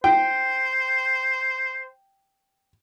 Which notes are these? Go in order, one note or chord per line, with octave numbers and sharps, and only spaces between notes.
C5 G5